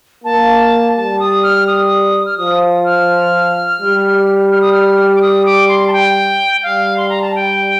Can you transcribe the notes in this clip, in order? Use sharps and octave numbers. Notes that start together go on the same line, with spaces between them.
A#3 A5
G3 A5
D#6
F6
D#6
F6
F3 D#6
F6
G3
F6
D#6
F6
D6
D#6
D6
C6
A5
G5
G3 F5
C6
A#5
A5
G5